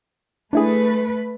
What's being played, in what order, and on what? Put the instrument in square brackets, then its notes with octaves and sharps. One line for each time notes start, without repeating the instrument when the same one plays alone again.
[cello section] A3 B4 [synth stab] D4 E4 G#4